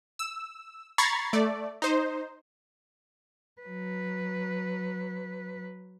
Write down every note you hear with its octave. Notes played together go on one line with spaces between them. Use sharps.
E6
A#5 B5 C#6 G#6 A6 C7
A3 D5
D#4 C5
F#3 B4